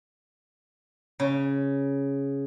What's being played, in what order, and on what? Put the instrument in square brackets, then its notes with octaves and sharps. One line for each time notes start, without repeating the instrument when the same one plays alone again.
[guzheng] C#3